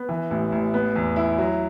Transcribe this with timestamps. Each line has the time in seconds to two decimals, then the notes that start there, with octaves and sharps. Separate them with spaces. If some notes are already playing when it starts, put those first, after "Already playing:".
Already playing: B3
0.09 E3
0.31 A1
0.52 A1
0.74 B3
0.96 E2
1.16 E4
1.38 F#3